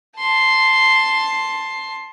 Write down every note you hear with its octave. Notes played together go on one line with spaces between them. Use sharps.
A5 C6